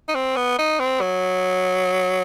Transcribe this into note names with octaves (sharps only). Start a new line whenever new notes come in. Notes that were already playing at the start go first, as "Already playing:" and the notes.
D#4
C4
B3
D#4
C4
F#3